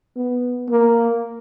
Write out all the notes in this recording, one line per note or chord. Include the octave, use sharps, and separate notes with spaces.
B3
A#3